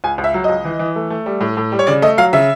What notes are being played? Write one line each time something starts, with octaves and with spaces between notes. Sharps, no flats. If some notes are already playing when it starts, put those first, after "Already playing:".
C#2 G#5
C#2
E5
F#3
C#2 D#5
E3
E3
A3
A3
G3
A2
A2
G3
C#5
C#3 D5
A3 D#5
F#3 F5
C#3 E5